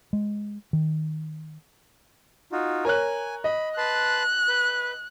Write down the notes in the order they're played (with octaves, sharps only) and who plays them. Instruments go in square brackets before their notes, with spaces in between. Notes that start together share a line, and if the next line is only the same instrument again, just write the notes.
[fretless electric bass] G#3
D#3
[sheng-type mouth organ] D#4 F4 F#4
[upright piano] A#4 C#5 F#6 [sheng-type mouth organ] G#5
[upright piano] D#5 [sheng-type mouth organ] B5
[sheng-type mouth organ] B4 A5 C6 [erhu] F#6
[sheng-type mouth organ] B4